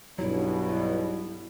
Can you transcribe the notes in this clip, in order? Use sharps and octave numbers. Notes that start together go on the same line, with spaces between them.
B1 G2 B2 F#3 E4